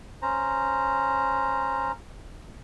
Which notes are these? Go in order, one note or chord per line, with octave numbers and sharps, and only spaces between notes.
C#4 C5 A#5